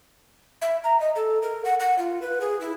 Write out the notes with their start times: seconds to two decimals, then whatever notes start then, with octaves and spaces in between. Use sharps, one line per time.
0.62 E5
0.84 A#5
1.00 D#5
1.16 A4
1.42 A#4
1.65 F#5
1.80 F#5
1.99 F4
2.22 B4
2.41 G#4
2.61 E4